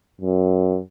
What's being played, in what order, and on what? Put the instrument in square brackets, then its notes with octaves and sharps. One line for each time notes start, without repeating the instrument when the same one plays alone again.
[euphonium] F#2